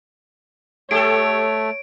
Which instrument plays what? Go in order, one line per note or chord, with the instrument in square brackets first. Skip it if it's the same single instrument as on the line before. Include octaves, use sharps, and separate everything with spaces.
[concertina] A3 [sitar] G4 A4 [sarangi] C#5 [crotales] D7